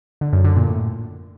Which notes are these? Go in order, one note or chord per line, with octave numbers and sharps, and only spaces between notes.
D3
F#2
D3
A#2
A2